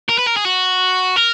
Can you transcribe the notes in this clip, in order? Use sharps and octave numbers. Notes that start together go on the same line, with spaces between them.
A#4
B4
A#4
G#4
F#4
A#4